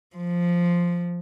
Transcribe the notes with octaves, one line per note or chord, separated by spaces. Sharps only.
F3